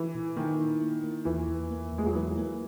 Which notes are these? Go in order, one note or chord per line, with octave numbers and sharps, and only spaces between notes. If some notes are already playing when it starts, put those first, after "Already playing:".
Already playing: E3
A#2
D#3 A#3
E4
A#3
A#3
E2 E3
E2
A#3
E2
G#3
F#3
E3 A#3
A#3